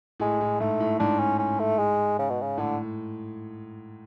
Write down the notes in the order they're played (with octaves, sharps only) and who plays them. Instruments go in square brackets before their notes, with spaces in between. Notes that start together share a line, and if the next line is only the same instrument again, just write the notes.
[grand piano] A2 [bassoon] G#3
[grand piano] A2
[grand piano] G#2 [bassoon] A3
[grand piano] A2
[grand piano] G#2 [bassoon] D4
[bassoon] C#4
C#4
A3
G#3
C#3
B2
C#3
[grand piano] A2 [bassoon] D3